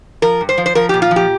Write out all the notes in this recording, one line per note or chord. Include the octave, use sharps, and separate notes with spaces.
F3 A#4
G2
C5
F3
C5
F3 A#4
G4
A#2
F4
F3
G4